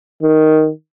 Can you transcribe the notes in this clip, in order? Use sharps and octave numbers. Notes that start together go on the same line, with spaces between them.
D#3